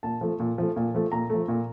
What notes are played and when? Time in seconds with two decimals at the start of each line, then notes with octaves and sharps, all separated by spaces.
0.03 A#2 A5
0.21 F3 A3
0.40 A#2
0.58 F3 A3
0.76 A#2
0.94 F3 A3
1.12 A#2 A#5
1.30 F3 A3
1.48 A#2